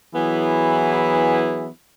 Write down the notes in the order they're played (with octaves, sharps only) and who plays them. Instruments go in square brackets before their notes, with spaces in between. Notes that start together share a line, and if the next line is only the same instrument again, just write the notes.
[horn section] E3 F#3 B3 E4 G#4